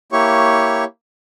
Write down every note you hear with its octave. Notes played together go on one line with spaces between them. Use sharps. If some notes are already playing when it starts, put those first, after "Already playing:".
A#3 E4 G4 C#5 C#6